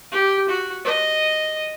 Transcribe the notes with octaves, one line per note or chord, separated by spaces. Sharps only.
G4
F#4
D#5